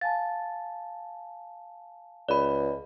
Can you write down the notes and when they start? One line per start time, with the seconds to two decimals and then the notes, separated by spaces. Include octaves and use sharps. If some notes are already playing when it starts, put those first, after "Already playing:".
0.01 F5 G#5 A5 A6
2.29 C#2 D5 B5